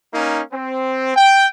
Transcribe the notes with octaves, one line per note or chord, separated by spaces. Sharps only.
A#3 C#4 D#4
C4
G5